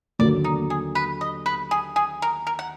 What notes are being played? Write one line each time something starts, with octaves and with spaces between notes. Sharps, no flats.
D#2 D3 F#3 A#3 D5
D#4
G#4
B4
D#5
B4
G#4
G#4
A#4
A#4
F#5